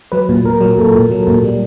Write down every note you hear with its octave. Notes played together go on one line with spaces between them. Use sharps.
F#3 B4
A#2
A#2 A#4
F#3
A#2 A4
A#2
F#3
A#2
G3